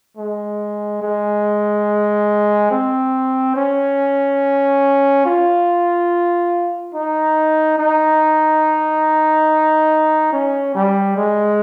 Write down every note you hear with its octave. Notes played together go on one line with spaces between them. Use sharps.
G#3
G#3
C4
C#4
F4
D#4
D#4
C#4
G3
G#3